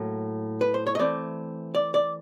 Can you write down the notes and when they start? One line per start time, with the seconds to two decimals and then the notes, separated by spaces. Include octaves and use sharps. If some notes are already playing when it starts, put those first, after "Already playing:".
Already playing: A2 F#3 A#3
0.61 B4
0.74 C5
0.87 C#5
0.95 D#5
0.99 E3 A3 C4 D5
1.75 D5
1.94 D5